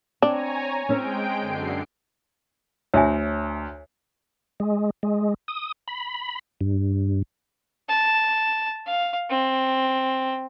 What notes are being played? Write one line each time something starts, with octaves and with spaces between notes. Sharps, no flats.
C4 D4 C#5 G#5 A#5
G#3 C4 C#4 G5 D7
F#2 D3 C7
D2 C#5 E5 G#5
G#3
G#3
D#6
B5
G2
A5
F5
C4